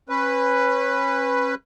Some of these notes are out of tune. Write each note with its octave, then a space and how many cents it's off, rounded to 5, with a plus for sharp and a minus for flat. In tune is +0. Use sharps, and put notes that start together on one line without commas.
C#4 -30 B4 +0